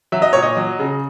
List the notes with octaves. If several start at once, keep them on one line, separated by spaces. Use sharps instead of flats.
F#3 E5
D#5
A#2 C#5
D#5
F#3
C#3